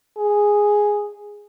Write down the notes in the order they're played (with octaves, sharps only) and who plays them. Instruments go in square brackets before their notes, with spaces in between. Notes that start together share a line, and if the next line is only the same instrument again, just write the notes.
[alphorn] G#4